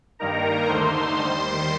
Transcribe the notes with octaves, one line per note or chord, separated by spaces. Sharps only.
G2 D#3 G3 A#3 D#4 A#4 A#5
D#2 D3 A3 D#4 C5 C6
D#2 D#3 G3